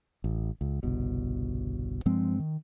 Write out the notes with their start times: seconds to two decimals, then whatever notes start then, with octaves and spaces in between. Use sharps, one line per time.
0.24 A1
0.61 C#2
0.83 G1 C2 B2
2.06 G2 F3 G#3 C4
2.40 D#3